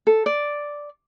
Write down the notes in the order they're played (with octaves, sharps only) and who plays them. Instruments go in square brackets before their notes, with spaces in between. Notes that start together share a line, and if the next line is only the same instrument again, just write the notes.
[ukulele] A4
D5